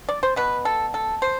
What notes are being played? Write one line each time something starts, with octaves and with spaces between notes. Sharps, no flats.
D5
C5
B2 B3 B4
A4
A4
C5